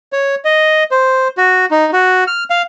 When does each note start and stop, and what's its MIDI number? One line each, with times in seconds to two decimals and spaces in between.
0.13 0.35 73
0.45 0.84 75
0.91 1.28 72
1.37 1.66 66
1.71 1.90 63
1.93 2.24 66
2.27 2.44 89
2.50 2.62 77